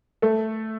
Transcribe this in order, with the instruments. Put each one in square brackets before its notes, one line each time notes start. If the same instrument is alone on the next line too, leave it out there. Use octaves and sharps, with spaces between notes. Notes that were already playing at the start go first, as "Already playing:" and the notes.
[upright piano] A3 A4